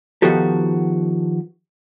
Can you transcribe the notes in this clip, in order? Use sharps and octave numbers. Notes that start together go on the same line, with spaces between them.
D#3 F3 B3 F#4 G4 A4